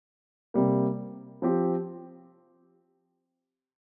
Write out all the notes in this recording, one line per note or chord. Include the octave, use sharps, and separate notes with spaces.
C3 G3 A#3
F3 C4 G4